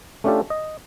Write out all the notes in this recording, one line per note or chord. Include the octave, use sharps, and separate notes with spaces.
A3 C#4 D4 F4 G4 A4
D#5